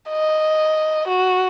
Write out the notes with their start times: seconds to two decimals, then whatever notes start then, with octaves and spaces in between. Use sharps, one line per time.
0.10 D#5
1.08 F#4